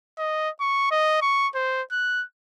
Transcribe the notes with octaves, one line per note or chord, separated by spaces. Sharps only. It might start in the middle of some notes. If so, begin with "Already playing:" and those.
D#5
C#6
D#5
C#6
C5
F#6